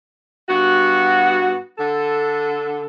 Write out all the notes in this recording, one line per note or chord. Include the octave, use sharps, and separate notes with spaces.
G2 B3 F#4
D3 A4